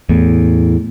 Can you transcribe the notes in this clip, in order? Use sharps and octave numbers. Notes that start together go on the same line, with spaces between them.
E2 A2